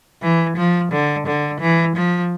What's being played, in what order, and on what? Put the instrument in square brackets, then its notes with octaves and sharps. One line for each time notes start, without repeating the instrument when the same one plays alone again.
[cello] E3
F3
D3
D3
E3
F3